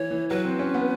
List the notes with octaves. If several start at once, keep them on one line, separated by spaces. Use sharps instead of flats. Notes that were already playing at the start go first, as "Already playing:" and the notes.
Already playing: E3 C#5
E3
F#3 B4
C4
C#4
B3